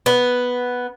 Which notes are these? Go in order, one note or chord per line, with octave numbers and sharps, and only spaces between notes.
B3